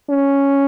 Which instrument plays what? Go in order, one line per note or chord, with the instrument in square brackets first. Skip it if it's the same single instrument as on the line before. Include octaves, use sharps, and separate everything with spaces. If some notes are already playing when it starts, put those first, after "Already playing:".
[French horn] C#4